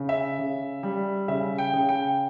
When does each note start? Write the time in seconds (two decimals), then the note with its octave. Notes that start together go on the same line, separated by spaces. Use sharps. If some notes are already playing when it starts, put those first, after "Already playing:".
Already playing: C#3
0.09 E5
0.39 C#3
0.83 G3
1.28 C#3 E5
1.58 G5
1.73 C#3
1.89 G5